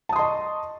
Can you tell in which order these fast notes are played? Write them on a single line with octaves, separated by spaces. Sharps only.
A5 D#6 C6 D#5 C#6